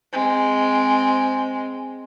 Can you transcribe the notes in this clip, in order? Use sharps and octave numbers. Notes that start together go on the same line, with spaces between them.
G#3 C4